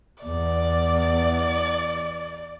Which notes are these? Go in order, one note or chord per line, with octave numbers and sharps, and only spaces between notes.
E2 D5